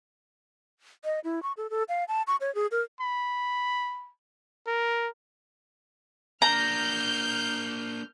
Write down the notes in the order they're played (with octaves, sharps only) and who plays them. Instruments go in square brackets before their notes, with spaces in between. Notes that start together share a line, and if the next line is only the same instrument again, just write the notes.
[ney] D#5
E4
C#6
A4
A4
F5
A5
C#6
C#5
G#4
A#4
[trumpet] B5
A#4
[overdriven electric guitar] A#3 D4 [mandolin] A#5 [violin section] F6 G6